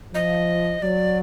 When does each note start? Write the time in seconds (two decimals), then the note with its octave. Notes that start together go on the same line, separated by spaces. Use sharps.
0.14 F3 D#5
0.82 F#3 D5